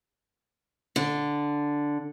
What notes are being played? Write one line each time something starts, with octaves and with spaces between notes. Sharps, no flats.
D3